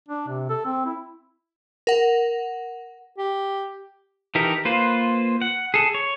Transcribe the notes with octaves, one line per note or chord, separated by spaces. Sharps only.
D4
C3
A4
C4
E4
A#4 F#5
G4
E3 D#4 G4 A4 A#4
A#3 F4 B4 C5
F#5
G#4 A4
C#5